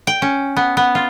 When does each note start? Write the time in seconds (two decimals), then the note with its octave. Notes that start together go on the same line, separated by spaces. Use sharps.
0.07 G5
0.22 C#4
0.56 B3
0.77 B3
0.95 F4